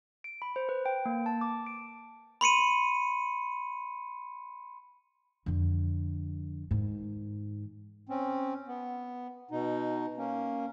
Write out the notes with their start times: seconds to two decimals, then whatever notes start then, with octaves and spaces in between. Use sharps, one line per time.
0.24 D7
0.42 B5
0.56 C5
0.69 B4
0.86 G5
1.05 A#3
1.26 A5
1.41 D6
1.67 D7
2.41 B5 C6 C#7 D#7
5.46 F2 D3
6.71 G#2 D#3
8.09 C4 C#4
8.67 B3
9.51 B2 D#4
10.17 A#3 C#4